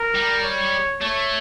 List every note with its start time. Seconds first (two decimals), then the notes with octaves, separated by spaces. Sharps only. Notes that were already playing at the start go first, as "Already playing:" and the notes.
Already playing: A#4
0.15 G3
0.44 C#5
1.01 A3 C#5